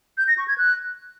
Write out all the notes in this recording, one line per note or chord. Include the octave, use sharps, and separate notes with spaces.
G6
A#6
C#6
G#6
F#6